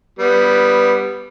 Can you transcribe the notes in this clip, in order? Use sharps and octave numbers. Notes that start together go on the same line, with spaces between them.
G3 B3